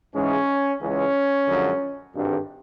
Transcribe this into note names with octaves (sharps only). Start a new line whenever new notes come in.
G#2 E3 G#3 C#4
C#2 C#3 E3 G#3 C#4
F#2 D3 F3 G#3
G#1 G2 D3